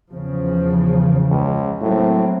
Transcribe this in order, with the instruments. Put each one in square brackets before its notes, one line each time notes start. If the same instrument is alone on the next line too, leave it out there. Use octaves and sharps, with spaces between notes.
[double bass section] E2 C#3 F3
[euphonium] C#2
[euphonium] A2 [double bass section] F#3 A#3 C4